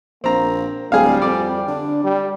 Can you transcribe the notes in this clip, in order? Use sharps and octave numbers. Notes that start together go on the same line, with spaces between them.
A#1 A#3 C4 A#5
D1 G3 G#4 F5
F2 D5
D3 D4
G3